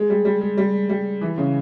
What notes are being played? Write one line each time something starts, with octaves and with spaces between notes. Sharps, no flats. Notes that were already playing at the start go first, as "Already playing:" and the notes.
Already playing: G#3
G3
G3
G#3
G3
G3
E3
C#3